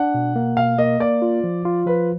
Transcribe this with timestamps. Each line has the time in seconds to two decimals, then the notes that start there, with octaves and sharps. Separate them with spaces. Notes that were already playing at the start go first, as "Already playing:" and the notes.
Already playing: D4 F#5
0.14 B2
0.36 A#3
0.57 B2 F5
0.78 A#3 D#5
1.00 A#3 D5
1.22 F4
1.44 F3
1.65 F4
1.86 F3 B4